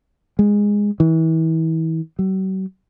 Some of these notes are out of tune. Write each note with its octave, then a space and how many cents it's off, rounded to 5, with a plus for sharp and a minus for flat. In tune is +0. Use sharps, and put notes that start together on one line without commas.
G#3 -10
E3 -35
F#3 +45